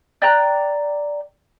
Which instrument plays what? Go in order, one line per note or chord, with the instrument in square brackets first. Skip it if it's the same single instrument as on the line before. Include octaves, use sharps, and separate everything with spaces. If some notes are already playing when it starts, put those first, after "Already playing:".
[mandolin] D5 G5 A#5 F#6